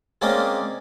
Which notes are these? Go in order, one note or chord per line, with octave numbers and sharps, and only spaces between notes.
G#3 A#3 C4 C#4 D5 D#5